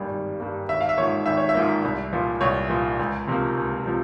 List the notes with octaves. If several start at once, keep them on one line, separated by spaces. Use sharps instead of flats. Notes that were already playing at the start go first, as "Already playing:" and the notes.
Already playing: G#1 G2 G3 A#3
G#1
G2 G3 A#3
G#1 E5
F5
E5
G#2 F3 A#3 C#5
G#1 E5
C#5
E5
G#2 F3 A#3
C2
A#2 F3
C2 C#5
A#2 F3
C#2
C3 F3 A#3
C#2
C3 F3